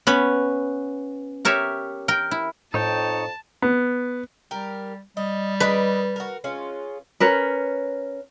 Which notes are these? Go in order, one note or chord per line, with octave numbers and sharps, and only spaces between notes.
B3 C#4 B5
G4 A#4 C#5 E5
A#4 G5
E4
F2 A2 D#4 C#5 G5 A5
B3
G3 G4 A#4
G3 D#5
A#4 B4 D5 D#5
F#4 A#4
G#3 C#4 F4
C#4 A#4 B4